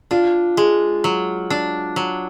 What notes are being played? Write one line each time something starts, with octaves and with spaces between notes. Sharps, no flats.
D4 F4
G#3
F#3
D4
F#3